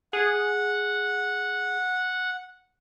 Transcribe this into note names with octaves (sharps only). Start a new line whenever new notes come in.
G#4 F#5